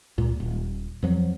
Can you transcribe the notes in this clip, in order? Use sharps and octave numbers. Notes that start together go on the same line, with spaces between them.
C#2 A#2
D#1
F2 F3 F#3